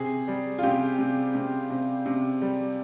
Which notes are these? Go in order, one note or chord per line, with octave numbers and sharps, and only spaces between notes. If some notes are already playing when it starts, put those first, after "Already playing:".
Already playing: C3 G#4
G3
F4
C3 G4
C3
C3
C3
C3
G3